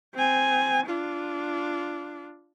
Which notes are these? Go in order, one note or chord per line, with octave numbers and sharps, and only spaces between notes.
C4 G#5
D4 F4